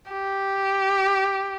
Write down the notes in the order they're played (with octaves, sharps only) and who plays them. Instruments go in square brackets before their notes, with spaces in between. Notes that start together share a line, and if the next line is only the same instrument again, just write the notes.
[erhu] G4